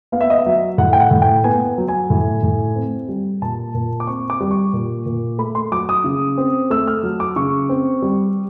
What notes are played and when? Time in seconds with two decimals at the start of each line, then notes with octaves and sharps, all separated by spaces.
0.12 B3 F5
0.21 E5
0.30 D#5
0.38 E5
0.46 F#3
0.78 A2 F#5
0.93 G5
1.00 F#5
1.11 A2
1.22 G5
1.44 B3 G#5
1.78 F#3
1.88 G#5
2.10 A2
2.43 A2
2.75 C4
3.09 G3
3.42 A#2 A5
3.74 A#2
4.00 D6
4.07 C4 C#6
4.30 D6
4.40 G3
4.51 C#6
4.73 A#2
5.06 A#2
5.38 A3 B5
5.55 C6
5.72 F#3 D6
5.89 D#6
6.04 C#3
6.38 C4
6.70 A3 E6
6.87 F6
7.03 F#3
7.20 D6
7.36 C#3 C#6
7.69 C4
8.02 G3